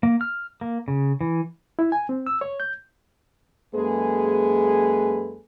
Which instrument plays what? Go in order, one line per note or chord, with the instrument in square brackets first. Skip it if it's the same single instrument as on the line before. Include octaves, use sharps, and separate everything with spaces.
[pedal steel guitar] A#3
F6
A#3
C#3
E3
[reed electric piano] E4
G#5
C4
E6
C#5
G6
[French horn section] F#2 G#3 A#3 G#4 A4 B4